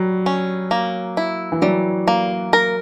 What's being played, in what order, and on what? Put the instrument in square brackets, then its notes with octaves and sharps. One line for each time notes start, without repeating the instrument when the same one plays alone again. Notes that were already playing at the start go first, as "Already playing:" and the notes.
Already playing: [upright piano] F#3 [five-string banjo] G3
[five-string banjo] C#4
A#3
E4
[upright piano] E3
[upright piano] F#3 [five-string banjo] G3
[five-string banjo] A#3
A#4